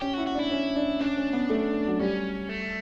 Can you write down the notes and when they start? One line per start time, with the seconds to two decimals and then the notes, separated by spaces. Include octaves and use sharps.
0.01 C#4 G4
0.13 F#4
0.18 E4
0.26 F#4
0.35 D4 E4
0.51 C#4
0.76 D4
1.00 C#4 D4
1.17 C#4
1.33 B3
1.50 A3
1.88 F#3
1.99 G3 C#4
2.49 A3